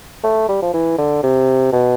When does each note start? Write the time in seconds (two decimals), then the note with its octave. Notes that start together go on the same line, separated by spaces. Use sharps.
0.24 A3
0.49 G3
0.62 F3
0.74 E3
0.99 D3
1.23 C3
1.73 B2